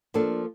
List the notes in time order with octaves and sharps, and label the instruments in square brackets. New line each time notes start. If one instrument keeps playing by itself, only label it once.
[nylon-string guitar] F3 A#3 D4 A4